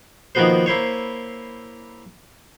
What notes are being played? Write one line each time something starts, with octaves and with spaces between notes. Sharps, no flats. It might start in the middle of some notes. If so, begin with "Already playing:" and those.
D#3 F3 A#3 B3 F#4 C5
A#3 E4 C5 C#5